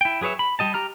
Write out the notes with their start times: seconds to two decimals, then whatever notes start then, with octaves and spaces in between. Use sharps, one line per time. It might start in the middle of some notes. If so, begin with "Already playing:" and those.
0.01 E4 G5
0.21 F#3 G#4 B4 C#5 E5
0.39 B5
0.59 G3 G4 D#5 A5
0.74 G4 A#5 F6